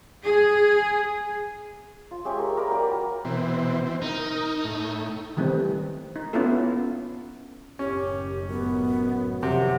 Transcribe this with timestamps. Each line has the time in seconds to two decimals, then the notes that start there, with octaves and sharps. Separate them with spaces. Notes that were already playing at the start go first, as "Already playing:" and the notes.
0.22 G#4
2.11 F4
2.25 G#3 C#4 G4 E5
2.39 A#4
2.56 G4 A#4 D5 B5
2.70 F#3 A#3 G4 D5
3.25 B2 E3 C4
3.86 E3 C4
4.02 D#4 A#4
4.64 A2
5.37 D#3 E3 G3 A3 C4
6.16 D#4
6.33 B3 C#4 D4 E4 F4 A4
7.79 F#1 A2 D#3 C#4 G4
8.50 F#2 B3
9.43 F2 C3 D#3 F3 F#5